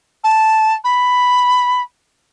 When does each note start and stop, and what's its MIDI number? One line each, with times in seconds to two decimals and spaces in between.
0.24 0.73 81
0.84 1.81 83